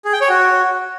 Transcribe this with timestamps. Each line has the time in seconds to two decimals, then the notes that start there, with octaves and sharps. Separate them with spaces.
0.05 G#4
0.13 G5
0.21 C#5
0.29 F#4